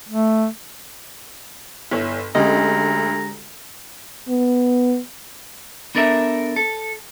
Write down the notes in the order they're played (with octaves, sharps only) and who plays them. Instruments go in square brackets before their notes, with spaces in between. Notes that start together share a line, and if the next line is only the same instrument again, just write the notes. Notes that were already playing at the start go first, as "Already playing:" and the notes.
[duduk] A3
[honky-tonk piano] G1 [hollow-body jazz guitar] E4 C#5
[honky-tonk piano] D2 [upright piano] D3 G#3 G4 [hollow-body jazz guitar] C#4 D#5 [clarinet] A#5
[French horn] B3
[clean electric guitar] B3 D4 A4 A#4 D5 E5
A4